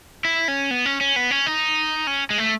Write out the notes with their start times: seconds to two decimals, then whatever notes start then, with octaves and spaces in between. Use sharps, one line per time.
0.25 E4
0.48 C#4
0.71 B3
0.86 C#4
1.01 C#4
1.16 B3
1.31 C#4
1.46 D#4
2.07 C#4
2.30 G#3
2.38 A3